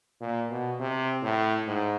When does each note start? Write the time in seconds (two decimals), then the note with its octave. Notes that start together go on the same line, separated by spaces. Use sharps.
0.21 A#2
0.50 B2
0.80 C3
1.23 A2
1.67 G#2